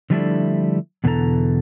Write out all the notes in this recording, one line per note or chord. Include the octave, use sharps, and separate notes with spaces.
D3 F3 G3 A3 D4 E4
E2 B2 D3 E3 A4 A#5